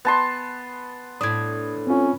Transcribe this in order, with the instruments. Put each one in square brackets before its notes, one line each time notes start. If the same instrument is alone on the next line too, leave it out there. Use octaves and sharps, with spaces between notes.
[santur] B3 A5 C6
[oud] A2 D4 [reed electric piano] D#6 G#6
[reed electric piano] C4 F4 [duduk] C#4